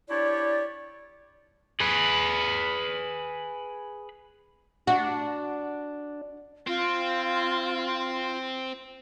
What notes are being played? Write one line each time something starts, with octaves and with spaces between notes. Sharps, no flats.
D4 E4 G4 C#5 D5
G#4 B4
D4 F#4
C4 F4